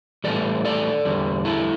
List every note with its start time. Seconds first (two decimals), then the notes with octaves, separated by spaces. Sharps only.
0.24 A2 E3 G3 A4 D5
0.65 A4 D5
1.05 E2 D3 G3
1.45 E4 A4